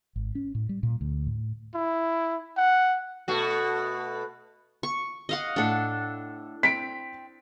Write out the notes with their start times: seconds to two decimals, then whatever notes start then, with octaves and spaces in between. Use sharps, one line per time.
0.16 G#1
0.35 C#4
0.55 A2
0.69 G3
0.83 A#2
1.01 D2
1.27 A2
1.74 E4
2.57 F#5
3.28 B2 A3 F#4
4.83 C#6
5.29 D#5 F5 F#5
5.56 A2 D4 A4 F#5
6.63 C4 B6 D7